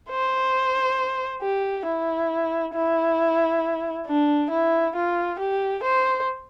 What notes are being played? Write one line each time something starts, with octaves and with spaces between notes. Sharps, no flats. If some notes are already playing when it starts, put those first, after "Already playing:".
C5
G4
E4
E4
D4
E4
F4
G4
C5